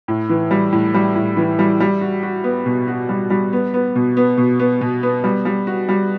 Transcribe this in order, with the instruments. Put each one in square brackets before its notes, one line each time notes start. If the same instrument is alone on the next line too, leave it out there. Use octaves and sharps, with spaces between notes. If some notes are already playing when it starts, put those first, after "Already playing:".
[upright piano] A2
E3
G3
A2
G3
A2
E3
G3
G3
F#4
F#4
B3
B2
F#4
G3
G3
B3
B3
B2
B3
B2
B3
B2
B3
G3
G3
F#4
G3